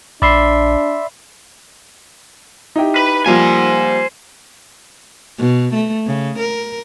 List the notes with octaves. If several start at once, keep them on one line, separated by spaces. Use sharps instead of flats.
A#1 D4 D5 E5 B5 C6 C7
D#4 E4 G4
B4
F3 G3 A#3 C5 G#5
B2
A3
C#3
A#4